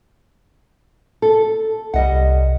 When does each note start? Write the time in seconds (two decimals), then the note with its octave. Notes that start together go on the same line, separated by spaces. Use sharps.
1.22 A4
1.94 C2 G3 D#5 F#5